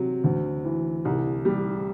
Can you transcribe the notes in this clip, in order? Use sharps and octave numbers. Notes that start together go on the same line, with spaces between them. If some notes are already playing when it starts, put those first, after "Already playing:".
Already playing: C3 F#3
D2
E3
C2
G3